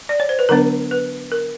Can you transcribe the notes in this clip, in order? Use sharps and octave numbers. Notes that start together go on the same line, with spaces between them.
D5
C#5
C5
B4
D3 F#3 B3 D4 A#4
B4
A#4